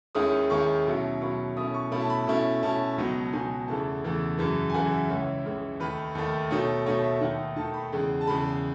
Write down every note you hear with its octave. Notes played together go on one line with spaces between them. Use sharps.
D#2 D#3 G#3 C#4 E4 D#6
D#2 D#3 G#3 C#4 E4 C#6
B2 F#3 C#4 E4
B2 F#3 C#4 E4 C#6
B2 A3 C#4 E4 D#6
C#6
B2 A3 C#4 E4 B5
A5
B5
B2 A3 C#4 E4
B2 A3 C#4 E4 A5
C#2 B2 F#3 B3 D#4
C#2 B2 F#3 B3 D#4 G#5
E2 C#3 E3 A3 A5
E2 C#3 E3 A3
F#2 C#3 E3
G#5
F#2 C#3 E3 F#5
E5
C#2 C#3 E3 C#5
C#2 C#3 E3
D#2 D#3 A3 B4
D#2 D#3 A3
B2 A3 D#4 C#5
B2 A3 D#4 C#5
E5
D#2 D#3 A3 D#4 F#5
D#2 D#3 A3 D#4 A5
B5
E2 C#3 G#3
A5
E2 C#3 G#3 B5